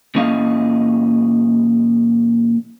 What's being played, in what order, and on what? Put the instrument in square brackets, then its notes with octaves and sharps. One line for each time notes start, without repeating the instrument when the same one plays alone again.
[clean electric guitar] A#2 E3 C#4 D#5 F5